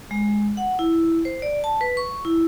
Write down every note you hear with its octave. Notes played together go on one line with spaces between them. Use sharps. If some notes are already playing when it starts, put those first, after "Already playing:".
G#3
F#5
E4
C5
D5
A5
B4
C#6
E4